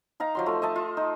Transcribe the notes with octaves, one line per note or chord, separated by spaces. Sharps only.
D#4 F5 A#5
F3 F#3 C6
A3
D#5 E5 A5
F4
D#4